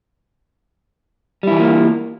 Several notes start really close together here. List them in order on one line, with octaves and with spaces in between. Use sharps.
G3 E4 E3 F4 A#3